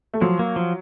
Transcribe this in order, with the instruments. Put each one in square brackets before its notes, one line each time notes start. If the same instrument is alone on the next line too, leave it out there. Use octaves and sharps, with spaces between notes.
[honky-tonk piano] A3
[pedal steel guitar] F3 [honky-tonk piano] F#3
[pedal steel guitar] A#3
F3